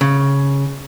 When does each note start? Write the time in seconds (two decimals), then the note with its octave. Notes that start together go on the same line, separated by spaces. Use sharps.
0.01 C#3